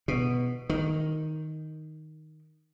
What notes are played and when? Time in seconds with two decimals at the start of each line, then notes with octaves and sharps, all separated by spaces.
0.08 B2
0.70 D#3